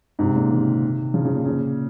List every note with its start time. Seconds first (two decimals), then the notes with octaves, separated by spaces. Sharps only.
0.19 G#2 C3
0.36 A#2 C#3
0.51 C3 D#3
1.14 C#3 F3
1.24 C#3 F3
1.35 A#2
1.45 A#2 C#3